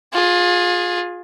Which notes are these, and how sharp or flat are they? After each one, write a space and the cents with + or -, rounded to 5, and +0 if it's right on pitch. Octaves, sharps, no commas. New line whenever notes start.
F4 +25 G#4 +0